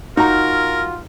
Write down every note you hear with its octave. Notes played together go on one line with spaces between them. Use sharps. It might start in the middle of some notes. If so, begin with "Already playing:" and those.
D#4 F4 F#4 A#4 A#5